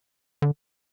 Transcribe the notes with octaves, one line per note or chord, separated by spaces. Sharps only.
D3